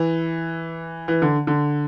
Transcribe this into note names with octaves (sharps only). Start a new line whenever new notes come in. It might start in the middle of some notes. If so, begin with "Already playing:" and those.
Already playing: E3
E3
D3
D3